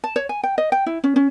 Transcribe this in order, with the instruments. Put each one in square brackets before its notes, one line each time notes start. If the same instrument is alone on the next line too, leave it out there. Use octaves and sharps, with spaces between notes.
[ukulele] A5
C#5
G#5
G5
D#5
G5
E4
C#4
C#4